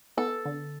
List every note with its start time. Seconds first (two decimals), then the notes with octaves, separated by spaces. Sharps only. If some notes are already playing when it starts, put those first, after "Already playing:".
0.17 B3 A4
0.45 D3